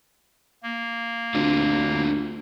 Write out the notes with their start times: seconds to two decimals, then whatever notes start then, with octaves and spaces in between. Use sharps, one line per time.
0.63 A#3
1.35 D2 C4 D4 F4